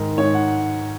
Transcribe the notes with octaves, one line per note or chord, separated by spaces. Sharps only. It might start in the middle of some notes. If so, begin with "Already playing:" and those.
Already playing: G#2 D#3 A#4
G#2 C#5
F#5